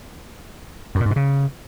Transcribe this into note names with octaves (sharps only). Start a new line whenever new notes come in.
F#2
A#2
G#2
B2
C#3